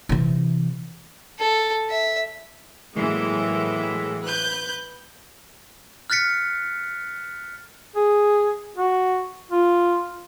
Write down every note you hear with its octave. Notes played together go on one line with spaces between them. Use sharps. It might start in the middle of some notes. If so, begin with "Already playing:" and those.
C3 E3
A4
E5
A2 E3 F#3 G#3 A#3
B4 F#6 G6
F6 F#6 A6 B6 C#7
G#4
F#4
F4